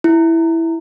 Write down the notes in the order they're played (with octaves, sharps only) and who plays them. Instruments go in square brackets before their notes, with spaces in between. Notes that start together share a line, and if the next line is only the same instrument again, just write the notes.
[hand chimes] E4